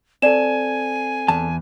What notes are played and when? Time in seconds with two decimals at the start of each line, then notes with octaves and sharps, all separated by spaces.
0.22 C4 A4 D5 G#5 E7
1.28 E2 A5